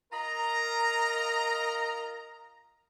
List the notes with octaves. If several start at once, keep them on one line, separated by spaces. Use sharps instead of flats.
F4 A#4 D#5 A#5